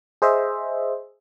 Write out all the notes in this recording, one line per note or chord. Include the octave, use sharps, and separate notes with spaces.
G#4 C5 D#5 E5